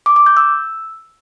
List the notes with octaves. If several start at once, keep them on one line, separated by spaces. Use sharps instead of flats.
D6
D6
G6
E6